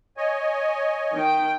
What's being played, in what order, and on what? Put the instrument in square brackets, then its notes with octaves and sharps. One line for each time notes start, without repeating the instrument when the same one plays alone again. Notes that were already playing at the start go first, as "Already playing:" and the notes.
[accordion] C#5 D#5 G#5
[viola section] D#3 G5